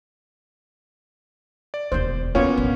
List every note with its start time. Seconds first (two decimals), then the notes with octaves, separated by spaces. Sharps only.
1.74 D5
1.92 E1 D#2 C5
2.35 D#2 A#3 B3 C#4 F4 C#5
2.57 A#1